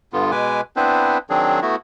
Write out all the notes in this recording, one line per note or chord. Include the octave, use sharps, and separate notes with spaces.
G2 D3 B3 F4
B2 G#3 B4 G#5 D6
B3 C4 D4 E4 B4 C5
D#3 F#3 C4 D4 G#4
A3 B3 E4 F#4